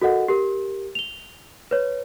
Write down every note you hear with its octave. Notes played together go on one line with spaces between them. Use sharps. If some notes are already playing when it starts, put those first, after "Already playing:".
F#4 A4 A#4 D#5 F#5
G4 A#4
F7 G7
B4 C#5